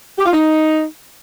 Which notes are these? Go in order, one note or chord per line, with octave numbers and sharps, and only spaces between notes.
G4
F4
D#4